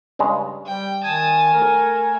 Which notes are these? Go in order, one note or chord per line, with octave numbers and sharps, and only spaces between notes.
G2 C#3 G#3
G3 G5
D#3 G#5 A5 D#6
A3 A#4